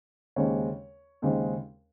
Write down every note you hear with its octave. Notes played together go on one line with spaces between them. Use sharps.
D#2 C#3 G#3 C4 C#5
D#2 C#3 G#3 C4